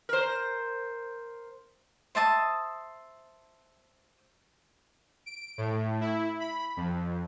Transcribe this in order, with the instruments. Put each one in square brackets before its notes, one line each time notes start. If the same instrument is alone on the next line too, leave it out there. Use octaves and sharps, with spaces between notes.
[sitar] A#4 C5
[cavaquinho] C5 E5 A5 D#6
[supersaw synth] D7
A2
E4
B5
F2